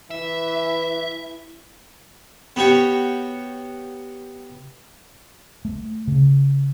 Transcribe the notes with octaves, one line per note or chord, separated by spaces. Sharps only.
E3 E4 E5
B3 F#4 G4 C#5
A3
C#3